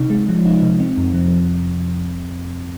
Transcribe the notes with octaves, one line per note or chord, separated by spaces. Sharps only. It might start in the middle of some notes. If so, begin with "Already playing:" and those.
Already playing: C3 D#4
G#3
F3
D#4
C3
C4
F2
F3